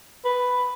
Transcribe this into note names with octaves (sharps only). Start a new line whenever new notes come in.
B4